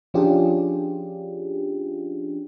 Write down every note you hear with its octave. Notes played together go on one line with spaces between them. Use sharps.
F3 C#4 D4 F4 G4 G#4